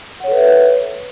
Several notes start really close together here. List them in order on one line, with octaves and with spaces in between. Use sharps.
F#5 C#5 A4 B4 E5